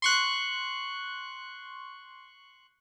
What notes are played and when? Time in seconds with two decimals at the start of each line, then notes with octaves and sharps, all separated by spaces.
0.02 C6 C#6 F#6